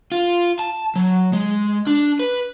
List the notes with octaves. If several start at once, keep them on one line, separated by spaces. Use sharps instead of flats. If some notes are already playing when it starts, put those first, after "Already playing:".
F4
A5
F#3
G#3
D4
B4